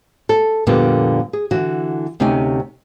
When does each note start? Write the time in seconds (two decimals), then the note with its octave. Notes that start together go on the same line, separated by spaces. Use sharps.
0.29 A4
0.67 F2 A#2 D3 G3 A#3 B3
1.33 G#4
1.51 D3 E3 F#4
2.20 D2 C3 C#4 D#4 G#5